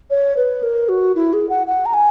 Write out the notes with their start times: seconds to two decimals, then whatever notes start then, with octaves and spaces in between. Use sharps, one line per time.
0.10 C#5
0.37 B4
0.63 A#4
0.89 F#4
1.15 E4
1.33 G#4
1.49 F#5
1.67 F#5
1.85 A#5
1.93 G#5